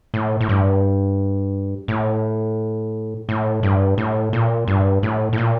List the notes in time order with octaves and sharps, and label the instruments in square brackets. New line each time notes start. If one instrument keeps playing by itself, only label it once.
[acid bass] A2
A2
G2
A2
A2
G2
A2
A#2
G2
A2
A2
A#2